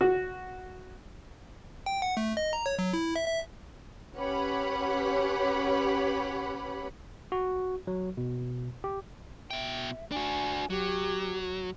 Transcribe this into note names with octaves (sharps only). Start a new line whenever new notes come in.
F#4
G5
F#5
A3
D#5
A#5
C#5
F#3
E4
E5
E5
C#4 G4 B4 C#5 F#5 B5
F#4
F#3
B2
G4
B2 E5 G5
D4 F#4 G#5
F#3 G4